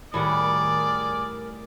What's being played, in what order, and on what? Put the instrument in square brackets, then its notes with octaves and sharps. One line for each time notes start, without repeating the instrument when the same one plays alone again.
[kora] A2 G3 F#5 [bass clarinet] D#3 [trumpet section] G#4 D5 [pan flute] A#4